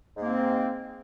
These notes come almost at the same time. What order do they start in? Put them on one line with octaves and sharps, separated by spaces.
G#2 A#3 C4